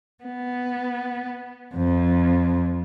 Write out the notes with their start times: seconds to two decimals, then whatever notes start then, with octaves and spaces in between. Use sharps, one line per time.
0.23 B3
1.75 F2